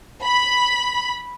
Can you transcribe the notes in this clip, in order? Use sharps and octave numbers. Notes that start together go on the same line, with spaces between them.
B5